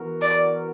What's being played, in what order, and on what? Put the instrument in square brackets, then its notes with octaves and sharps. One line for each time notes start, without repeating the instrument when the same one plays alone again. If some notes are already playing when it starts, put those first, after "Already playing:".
Already playing: [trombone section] E3 B3 F#4 A#4
[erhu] D5